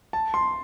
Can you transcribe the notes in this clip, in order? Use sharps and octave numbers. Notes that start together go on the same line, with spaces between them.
A5
C6